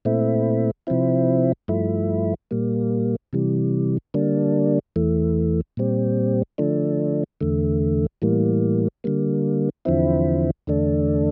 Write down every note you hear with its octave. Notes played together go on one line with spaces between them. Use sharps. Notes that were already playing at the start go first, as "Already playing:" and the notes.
A#2 A3 C4 E4
C3 F3 C4 E4
G2 F3 A3 E4
A#2 G3 A#3
C3 E3 G3
D3 G3 A#3 D4
E2 E3 A3
A#2 G3 C4
D3 F3 A3 D4
E2 D3 A3
A2 E3 G3 A#3
D3 G3 A#3
E2 D3 F3 C4 E4
E2 D3 A3 D4